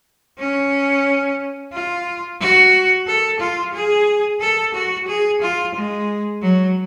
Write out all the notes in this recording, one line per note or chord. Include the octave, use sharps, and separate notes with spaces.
C#4
F4
F#4
A4
F4
G#4
A4
F#4
G#4
F4
G#3
F#3